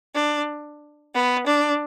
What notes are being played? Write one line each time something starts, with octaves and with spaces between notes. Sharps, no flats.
D4
B3
D4